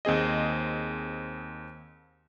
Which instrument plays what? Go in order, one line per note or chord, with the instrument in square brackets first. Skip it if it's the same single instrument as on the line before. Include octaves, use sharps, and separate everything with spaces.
[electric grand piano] D#2 C4 G#4 D#5